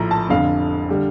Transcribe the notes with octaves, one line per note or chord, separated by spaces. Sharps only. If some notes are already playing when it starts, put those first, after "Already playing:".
Already playing: A#1 A2 F3 A#5
A5
F1 F2 D3 F5
D3 G3